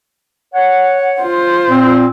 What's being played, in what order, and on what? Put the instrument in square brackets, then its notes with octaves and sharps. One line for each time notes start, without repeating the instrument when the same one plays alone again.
[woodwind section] C#5 F#5
[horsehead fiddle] F4 C5
[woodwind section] A#2 C4